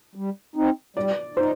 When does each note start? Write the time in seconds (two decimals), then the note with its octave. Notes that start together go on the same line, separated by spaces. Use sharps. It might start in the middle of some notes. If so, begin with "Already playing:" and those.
0.15 G3
0.56 C4 D#4
0.97 G3 D5
1.37 D#4 C5